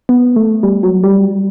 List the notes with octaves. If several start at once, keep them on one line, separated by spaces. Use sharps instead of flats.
B3
A3
G3
F#3
G3